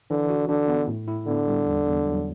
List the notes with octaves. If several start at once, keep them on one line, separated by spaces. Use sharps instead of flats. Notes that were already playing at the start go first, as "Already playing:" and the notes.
D3 E3
F#4
D3 D4
B3
A2
E4
D3 B3
G3
E2
E2
F#3